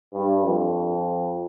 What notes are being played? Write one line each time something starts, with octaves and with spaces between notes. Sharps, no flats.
G2
F2